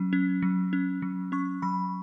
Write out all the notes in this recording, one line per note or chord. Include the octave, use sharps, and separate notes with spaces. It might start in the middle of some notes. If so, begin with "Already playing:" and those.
Already playing: F#3 C#4
C#4
F#3
C#4
F#3
C#4 C#6
F#3 B5